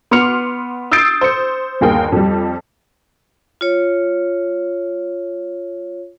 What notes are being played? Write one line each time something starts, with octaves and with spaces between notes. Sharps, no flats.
B3 C6 D6 F6 C#7 F7
D#6 E6 G6 A6 C7 D7
C5 C#7
G1 D#2 G#4 A#4 G5
F2 G3
F4 C#5